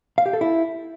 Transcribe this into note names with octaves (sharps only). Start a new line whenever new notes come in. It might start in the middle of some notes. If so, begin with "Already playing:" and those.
F5
G4
A4
E4